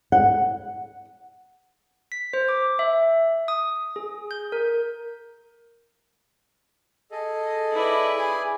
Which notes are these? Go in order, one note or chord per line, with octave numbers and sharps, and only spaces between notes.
F#5
B6
C5
D6
E5
D#6
G#4
G6
A#4
G#4 A4 D#5
E4 B4 D5
G#4 G#5